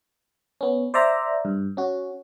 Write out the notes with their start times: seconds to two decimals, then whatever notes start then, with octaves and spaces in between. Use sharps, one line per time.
0.61 B3 C#4
0.94 C5 D5 E5 A#5
1.45 G2
1.77 C#4 F#4